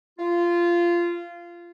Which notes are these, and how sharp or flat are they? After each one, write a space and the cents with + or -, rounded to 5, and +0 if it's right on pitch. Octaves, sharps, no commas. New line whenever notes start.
F4 -15